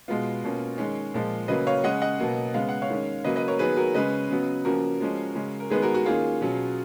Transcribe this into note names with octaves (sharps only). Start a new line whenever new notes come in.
B2 G#3 B3 F4
B2 A#3 C#4
D#3 G#3 C#4
A#2 F3 G#3
C#3 F#3 A#3 B4 D#5
C#5 F5
C#3 G#3 C#4 D#5 F#5
D#5 F#5
B2 F#3 A#3
C#3 G#3 B3 F5
F#5
C#5 F5
D#3 G#3 C#4
C#3 F#3 A#3 B4 D#5
B4 D#5
A#4 C#5
D#3 F#3 B3 G#4 B4
F#4 A#4
C#3 G#3 C#4 B4 D#5
C#3 F#3 B3
C#3 F3 A#3 C#4 F#4 A#4
F3 G#3 C#4
C#3 G#3 C#4
A#4
D#3 G#3 B3 G#4 B4
F#4 A#4
F#4
D#3 A#3 C#4 F4 G#4
B2 F#3 C#4